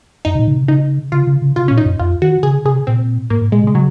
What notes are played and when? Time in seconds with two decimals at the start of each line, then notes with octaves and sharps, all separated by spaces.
0.25 F#2 D#4
0.35 C3
0.39 A#2
0.48 C#3
0.55 C3
0.68 C#3 D#4
1.12 C#3 F4
1.27 C#3
1.42 C#3
1.56 C3 F4
1.68 A#2 C#4
1.78 D#4
1.86 F#2
2.00 F2 F4
2.22 D#3 F#4
2.43 C#3 G#4
2.65 C3 G#4
2.87 A#2 C4
3.30 G#2 A#3
3.42 G#2
3.52 A#2 G#3
3.64 C3
3.67 G#3
3.75 C#3 F#3